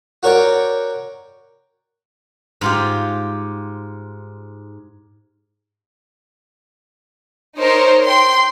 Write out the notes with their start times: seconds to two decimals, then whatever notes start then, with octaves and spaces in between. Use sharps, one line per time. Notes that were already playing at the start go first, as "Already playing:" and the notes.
0.23 F#4 A#4 C#5 D5 G5
2.61 G#2 F4 G4
7.57 D#4 A#4 C5 C#5
8.03 G5 C6